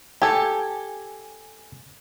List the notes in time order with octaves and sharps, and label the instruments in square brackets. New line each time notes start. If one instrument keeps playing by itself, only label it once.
[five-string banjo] G4 A4 [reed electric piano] G#5 G#6